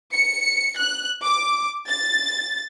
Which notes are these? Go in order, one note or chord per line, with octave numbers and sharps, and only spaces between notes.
C#7
F#6
D6
A6